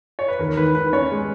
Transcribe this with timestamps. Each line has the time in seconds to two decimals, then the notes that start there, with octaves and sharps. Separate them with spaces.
0.19 C#5
0.28 B4
0.39 D#2 A#4
0.57 D#3 B4
0.75 D#3 B4
0.92 C#4 C#5
1.11 G#3